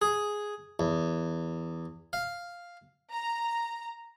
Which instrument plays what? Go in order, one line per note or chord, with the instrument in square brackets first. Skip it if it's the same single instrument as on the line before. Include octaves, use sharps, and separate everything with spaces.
[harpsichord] G#4
E2
F5
[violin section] A#5